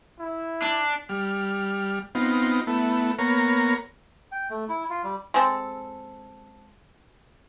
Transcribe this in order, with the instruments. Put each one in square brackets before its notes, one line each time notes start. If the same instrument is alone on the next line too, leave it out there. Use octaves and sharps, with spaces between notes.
[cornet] E4
[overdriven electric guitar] D4
[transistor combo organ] G3 F6
B3 C4 D#4 F4
A3 B3 E4
A#3 B3 A#4 C#5
[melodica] G5
A3
E4
F4
G3
[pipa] G#3 C4 A4